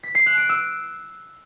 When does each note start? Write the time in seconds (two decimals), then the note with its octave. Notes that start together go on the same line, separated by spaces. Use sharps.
0.03 B6
0.15 C7
0.26 F#6
0.38 D7
0.49 E6